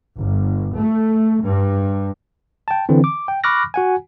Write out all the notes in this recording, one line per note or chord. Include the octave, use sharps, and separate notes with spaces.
G1
A3
G2
G5 A5
D3 E3 C4
D6
G5
B5 C#6 D6 F6 F#6 A#6
F#4 F#5 G#5